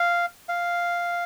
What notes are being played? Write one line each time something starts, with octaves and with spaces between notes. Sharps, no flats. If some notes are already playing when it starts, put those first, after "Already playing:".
Already playing: F5
F5